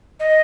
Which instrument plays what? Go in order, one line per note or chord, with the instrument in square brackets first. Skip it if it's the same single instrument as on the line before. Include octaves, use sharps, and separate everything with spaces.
[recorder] D#5